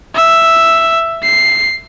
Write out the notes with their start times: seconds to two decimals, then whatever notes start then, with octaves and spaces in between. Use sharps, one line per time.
0.15 E5
1.23 C7